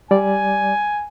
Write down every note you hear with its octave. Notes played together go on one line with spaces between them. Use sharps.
G3 D5 G#5